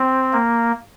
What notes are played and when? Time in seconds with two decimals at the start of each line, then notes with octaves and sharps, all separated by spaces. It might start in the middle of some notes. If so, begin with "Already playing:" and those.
Already playing: C4
0.33 A#3